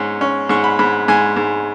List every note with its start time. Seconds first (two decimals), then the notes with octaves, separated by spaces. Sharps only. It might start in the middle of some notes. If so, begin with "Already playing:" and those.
Already playing: G#2 C#4
0.21 C#4
0.49 G#2 C#6
0.64 B5
0.79 G#2 B5
1.08 G#2 G#5
1.37 G#2